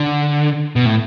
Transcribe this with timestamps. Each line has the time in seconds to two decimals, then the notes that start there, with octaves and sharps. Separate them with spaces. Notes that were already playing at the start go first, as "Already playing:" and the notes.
Already playing: D3
0.76 B2
0.85 A2